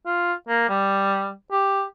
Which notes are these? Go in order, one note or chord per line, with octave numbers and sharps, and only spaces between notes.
F4
A#3
G3
G4